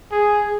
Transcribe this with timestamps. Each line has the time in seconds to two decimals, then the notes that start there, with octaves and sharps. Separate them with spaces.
0.12 G#4